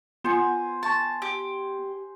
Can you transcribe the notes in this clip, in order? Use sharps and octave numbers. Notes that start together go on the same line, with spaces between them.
B3 F4 C5 G#5
A5 C6 C#6
G4